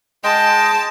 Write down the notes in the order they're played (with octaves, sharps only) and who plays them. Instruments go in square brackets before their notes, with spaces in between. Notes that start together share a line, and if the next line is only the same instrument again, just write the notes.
[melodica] G#3 D#5 G5 [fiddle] A5